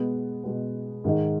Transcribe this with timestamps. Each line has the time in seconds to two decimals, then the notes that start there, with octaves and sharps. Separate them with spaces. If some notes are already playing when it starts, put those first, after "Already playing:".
Already playing: B2 G#3 B3
0.44 B2 G#3 B3
1.04 G#2 D#3 G#3 D#4